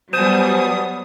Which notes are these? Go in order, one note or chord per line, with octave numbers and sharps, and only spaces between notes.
F#3 G3 B3 C5 G#5 A5 D#6